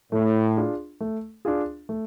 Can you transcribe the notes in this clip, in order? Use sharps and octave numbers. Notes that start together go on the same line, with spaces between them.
A2 A3
D4 F4 G#4
A3
D4 F4 G#4
A3